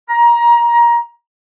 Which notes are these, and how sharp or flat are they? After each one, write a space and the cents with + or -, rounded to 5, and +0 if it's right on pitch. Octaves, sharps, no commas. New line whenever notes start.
A#5 +20